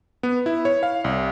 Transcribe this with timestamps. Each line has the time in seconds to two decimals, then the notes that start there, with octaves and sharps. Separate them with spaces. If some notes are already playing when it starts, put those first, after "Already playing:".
0.23 B3
0.46 E4
0.65 C#5
0.83 F5
1.04 C2